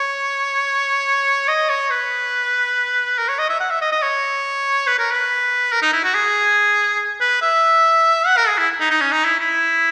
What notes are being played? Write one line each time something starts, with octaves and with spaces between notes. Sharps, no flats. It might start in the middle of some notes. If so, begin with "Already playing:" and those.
Already playing: C#5
D#5
C#5
B4
A#4
C#5
D#5
E5
F#5
E5
D#5
D#5
C#5
B4
A#4
B4
A#4
D#4
E4
F#4
G#4
B4
E5
F#5
A#4
G#4
E4
D#4
D#4
C#4
D#4
E4
E4